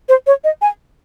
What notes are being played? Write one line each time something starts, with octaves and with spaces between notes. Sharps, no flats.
C5
C#5
D#5
G#5